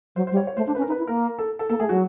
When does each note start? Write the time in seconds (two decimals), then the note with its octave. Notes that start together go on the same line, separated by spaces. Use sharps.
0.16 F#3 C5
0.27 C5
0.31 G3
0.37 C#5
0.47 C#5
0.57 A3 C5
0.67 D4 C5
0.75 B4
0.77 C#4
0.82 A#4
0.88 D#4 B4
0.98 E4
1.07 A#3 A#4
1.39 A4
1.59 A4
1.69 A#3 A4
1.79 A3 G#4
1.89 F#3 F#4